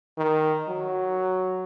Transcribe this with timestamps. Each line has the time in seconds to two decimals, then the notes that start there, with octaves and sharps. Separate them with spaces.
0.18 D#3
0.69 F#3